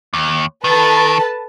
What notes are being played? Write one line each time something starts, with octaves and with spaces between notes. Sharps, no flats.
D#2
D#3 A4 B4 A5